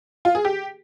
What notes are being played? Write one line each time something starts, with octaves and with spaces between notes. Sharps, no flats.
F4
G#4
G4